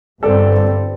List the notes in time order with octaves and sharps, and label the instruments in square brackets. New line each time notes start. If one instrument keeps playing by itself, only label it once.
[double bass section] G1 G2 G3 C4 [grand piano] A4 D5